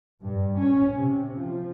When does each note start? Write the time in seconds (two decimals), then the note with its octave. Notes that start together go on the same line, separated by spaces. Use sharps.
0.23 G2
0.57 C#4
0.94 C3
1.36 F3